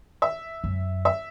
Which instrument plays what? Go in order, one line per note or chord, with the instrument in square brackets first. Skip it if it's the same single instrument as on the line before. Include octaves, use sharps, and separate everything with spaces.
[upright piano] E5
[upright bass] F#2
[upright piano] E5